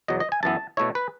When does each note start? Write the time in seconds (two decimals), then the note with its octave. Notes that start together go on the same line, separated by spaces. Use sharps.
0.08 E2 B2 F#3 D#5
0.20 D#5
0.32 G#5
0.43 F#2 E3 B3 E4 A5
0.77 B2 A3 E4 C#5
0.95 B4